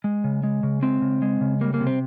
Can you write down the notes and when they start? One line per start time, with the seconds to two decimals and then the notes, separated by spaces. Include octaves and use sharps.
0.04 G#3
0.24 C#3
0.44 G#3
0.63 C#3
0.82 G#3 C4
1.02 C#3
1.22 G#3
1.41 C#3
1.61 G3 A#3
1.74 A#3
1.80 C3
1.87 C4